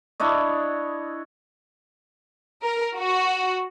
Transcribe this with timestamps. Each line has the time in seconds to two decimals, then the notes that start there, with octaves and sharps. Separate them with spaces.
0.20 D4 E4 C#5 D#5
2.63 A#4
2.96 F#4